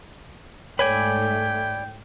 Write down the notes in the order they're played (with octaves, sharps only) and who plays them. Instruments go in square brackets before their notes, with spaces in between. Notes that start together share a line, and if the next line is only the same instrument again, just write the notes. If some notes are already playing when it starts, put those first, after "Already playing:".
[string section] G#2 A3 [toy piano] C#5 [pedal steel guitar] D5 G#5 B5 [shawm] G5